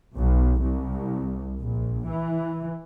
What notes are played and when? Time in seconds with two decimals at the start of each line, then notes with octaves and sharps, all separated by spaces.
0.15 B1
0.61 C2
1.60 A#1
2.07 E3